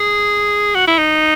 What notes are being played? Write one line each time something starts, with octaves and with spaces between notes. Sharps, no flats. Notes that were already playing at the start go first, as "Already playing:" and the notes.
Already playing: G#4
F#4
E4
D#4